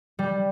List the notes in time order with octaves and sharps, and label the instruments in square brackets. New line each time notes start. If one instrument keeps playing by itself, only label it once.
[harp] G3